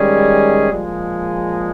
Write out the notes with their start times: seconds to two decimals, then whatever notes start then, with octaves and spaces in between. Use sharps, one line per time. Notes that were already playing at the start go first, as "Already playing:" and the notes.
Already playing: D#3 G3 G#3 C#4 G#4
0.69 A#2 F3 G#3